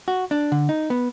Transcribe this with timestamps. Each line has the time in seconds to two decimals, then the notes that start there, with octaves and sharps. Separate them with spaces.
0.08 F#4
0.31 D4
0.52 D3
0.69 D#4
0.90 B3